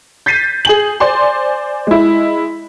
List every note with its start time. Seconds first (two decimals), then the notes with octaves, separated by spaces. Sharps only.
0.26 G6 A6 B6 C7 D#7
0.65 G#4 G#5 F#7
1.00 C5 D5 G#5 C6
1.87 G#3 E4